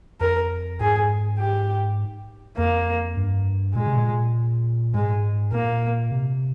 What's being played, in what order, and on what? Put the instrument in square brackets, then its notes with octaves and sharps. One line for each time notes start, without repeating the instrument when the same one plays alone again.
[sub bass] F2 [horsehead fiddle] A#4
[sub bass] G#2 [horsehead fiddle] G#4
[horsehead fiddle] G4
[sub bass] F2 [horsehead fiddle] A#3
[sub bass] G2
[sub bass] A#2 [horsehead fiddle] G#3
[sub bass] C3
A#2
[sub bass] G#2 [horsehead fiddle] G#3
[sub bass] A#2 [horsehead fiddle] A#3
[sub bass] C3